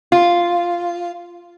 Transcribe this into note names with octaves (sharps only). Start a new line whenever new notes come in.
F4